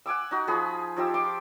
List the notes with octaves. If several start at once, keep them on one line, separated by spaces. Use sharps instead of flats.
F#5 G#5 D6 E6
D#4 F#4
F3 G#4 B5 D#6
F3 D#4 G4 E6
C6 D6